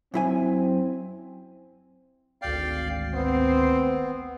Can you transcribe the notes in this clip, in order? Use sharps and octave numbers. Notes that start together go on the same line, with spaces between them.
F#2 C4 E4 G#5
G#1 D2 D5 F5 G5 C7
B3 C4